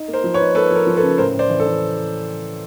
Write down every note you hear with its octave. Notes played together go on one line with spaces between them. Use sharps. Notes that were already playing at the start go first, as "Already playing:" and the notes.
Already playing: D#4
A#3
A#4 C5
F3
B4 C#5
D#4
A#3 A4 B4
F3
A#4
F3
A4 B4
C#3
A2 A#4 C5
A2
C5 D5
E3
A4
E3